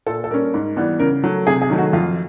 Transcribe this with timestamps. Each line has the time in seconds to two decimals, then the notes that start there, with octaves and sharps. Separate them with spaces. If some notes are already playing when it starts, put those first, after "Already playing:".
0.06 A#2 A4
0.24 A4
0.30 G3 A#3 C#4 A#4
0.54 G#2
0.76 E3 G3 B3
0.99 C#3 A#4
1.24 F#3 A3
1.47 C3 G#4
1.62 G#4
1.70 D#3 F#3 A3
1.78 F#4
1.93 F2 F4